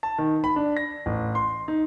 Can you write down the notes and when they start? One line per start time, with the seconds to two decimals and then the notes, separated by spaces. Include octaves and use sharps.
0.03 A5
0.18 D#3
0.44 B5
0.56 D4
0.77 A#6
1.06 A1
1.35 C6
1.68 D#4